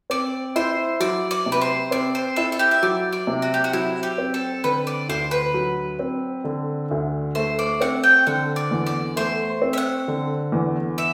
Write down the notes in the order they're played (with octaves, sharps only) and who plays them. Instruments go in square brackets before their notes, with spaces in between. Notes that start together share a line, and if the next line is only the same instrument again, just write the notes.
[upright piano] C4 [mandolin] D5
[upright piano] E4 [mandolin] C5
[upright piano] F#3 [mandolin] D5
[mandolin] D5
[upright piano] C3
[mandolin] B4
C5
[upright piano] C4 [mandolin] D5
[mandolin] C5
[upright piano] E4 [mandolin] A4
[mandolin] A4
G4
E5
[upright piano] F#3 [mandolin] D5
[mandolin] D5
[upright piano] C3
[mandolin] F#4
G4
F#4
[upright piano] F#3 [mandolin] E4
[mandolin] G4
[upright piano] C4
[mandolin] A4
[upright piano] D3 [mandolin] B4
[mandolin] D5
[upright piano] D2 [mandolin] C5
[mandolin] B4
[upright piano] F#3
C4
D3
D2
[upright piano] A3 [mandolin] C5
[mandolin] D5
[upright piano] C4 [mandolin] F#5
[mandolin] G5
[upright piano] D3 [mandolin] F#5
[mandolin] D5
[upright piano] E2
[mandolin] D5
[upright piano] A3 [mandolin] C5
[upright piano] C4
[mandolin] E5
F#5
[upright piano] D3
E2
[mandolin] E5